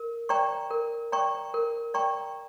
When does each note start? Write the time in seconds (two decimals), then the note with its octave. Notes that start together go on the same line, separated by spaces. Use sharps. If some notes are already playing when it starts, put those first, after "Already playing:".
Already playing: A#4
0.29 D5 G5 A#5 C#6
0.71 A#4
1.12 D5 G5 A#5 C#6
1.54 A#4
1.94 D5 G5 A#5 C#6